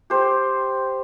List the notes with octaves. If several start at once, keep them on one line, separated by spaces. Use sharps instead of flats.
G4 C5